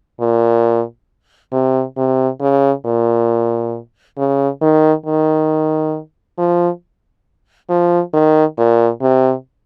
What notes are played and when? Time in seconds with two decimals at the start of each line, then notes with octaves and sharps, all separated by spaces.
0.20 A#2
1.52 C3
1.97 C3
2.41 C#3
2.85 A#2
4.18 C#3
4.62 D#3
5.06 D#3
6.38 F3
7.70 F3
8.14 D#3
8.58 A#2
9.02 C3